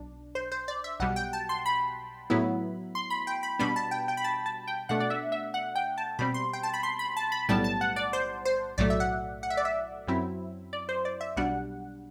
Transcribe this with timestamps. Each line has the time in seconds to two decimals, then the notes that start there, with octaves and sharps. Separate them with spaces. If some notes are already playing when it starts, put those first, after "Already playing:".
Already playing: B1 D4
0.35 C5
0.52 C5
0.68 D5
0.84 E5
1.00 B1 B2 G3 F#5
1.16 G5
1.33 A5
1.49 C6
1.66 B5
2.30 A2 F#3 B3 E4
2.95 C6
3.10 B5
3.27 G5
3.43 B5
3.59 B2 G3 B3 D4 B5
3.76 A5
3.91 G5
4.08 G5
4.17 B5
4.24 A5
4.46 A5
4.67 G5
4.89 B2 A3 D4 F#5
5.00 D5
5.10 E5
5.32 E5
5.54 F#5
5.75 G5
5.98 A5
6.19 B2 G3 C4 B5
6.34 C6
6.53 G5
6.63 A5
6.74 B5
6.83 C6
6.99 B5
7.17 A5
7.32 B5
7.49 B1 A2 G3 B3 A5
7.64 A5
7.81 F#5
7.96 D5
8.13 C5
8.45 C5
8.78 B1 A2 F#3 A3 D5
8.90 E5
9.00 F#5
9.43 F#5
9.50 E5
9.57 D5
9.65 E5
10.08 F#2 F#3 C4 E4
10.73 D5
10.89 C5
11.05 D5
11.21 E5
11.37 B1 B2 G3 D4 F#5